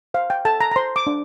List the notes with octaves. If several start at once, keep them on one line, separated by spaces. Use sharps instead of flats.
C5 F5
G5
A4 A5
A#5
A#5
C5 C6
D6
D4